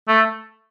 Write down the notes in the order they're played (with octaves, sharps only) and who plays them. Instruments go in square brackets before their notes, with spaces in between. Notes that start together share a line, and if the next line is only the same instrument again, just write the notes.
[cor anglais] A3